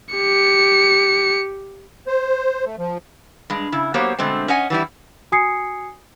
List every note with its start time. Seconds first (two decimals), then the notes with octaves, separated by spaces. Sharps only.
0.15 G4 C#7
2.07 C5
2.65 A3
2.78 F3
3.50 G2 G#3
3.72 C#3 E4
3.94 F#3 A#3 B3 G4 C5 C#5
4.18 B2 D3 G#3 A3 C4
4.48 C#4 C#5 D#5 F#5 G#5
4.70 E3 G3 E4
5.32 F#4 G#5 D#6 G#6 C7 C#7